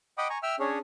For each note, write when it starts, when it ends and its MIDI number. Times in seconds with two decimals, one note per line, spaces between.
0.18 0.28 75
0.18 0.28 78
0.18 0.28 79
0.18 0.28 83
0.18 0.28 86
0.18 0.28 87
0.30 0.38 80
0.30 0.38 82
0.30 0.38 85
0.43 0.56 76
0.43 0.56 79
0.43 0.56 88
0.43 0.56 89
0.59 0.79 61
0.59 0.79 62
0.59 0.79 68
0.59 0.79 73